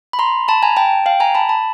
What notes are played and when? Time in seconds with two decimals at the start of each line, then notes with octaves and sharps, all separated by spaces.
0.13 B5
0.19 A#5 C6
0.48 A5 B5
0.63 G#5 A#5
0.77 G5 A5
1.06 F5 G5
1.20 G#5 A#5
1.35 A5 B5
1.49 A5 B5